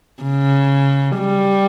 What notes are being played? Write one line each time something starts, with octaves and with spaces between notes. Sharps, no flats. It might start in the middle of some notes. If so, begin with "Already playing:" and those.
C#3
G3